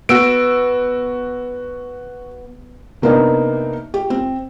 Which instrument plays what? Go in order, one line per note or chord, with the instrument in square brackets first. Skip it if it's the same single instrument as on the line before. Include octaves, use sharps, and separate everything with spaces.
[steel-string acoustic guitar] B3 [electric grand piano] F#4 E6 D7
[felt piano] C3 A#3 B3 D4 D#4
G4
C4